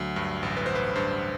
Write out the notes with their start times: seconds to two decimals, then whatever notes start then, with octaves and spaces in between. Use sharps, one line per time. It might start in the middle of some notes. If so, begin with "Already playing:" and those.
Already playing: D2 F#3
0.16 G2
0.43 A1
0.57 B4
0.66 A1 C5
0.75 B4
0.96 G2 C5